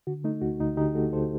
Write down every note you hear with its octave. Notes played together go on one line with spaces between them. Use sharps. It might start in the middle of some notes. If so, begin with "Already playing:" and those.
D3 F#4
A3 D#4
D2 F#4
D2 D#4
D3 D#4 G4
A3 F#4 A4
D2 A4 C5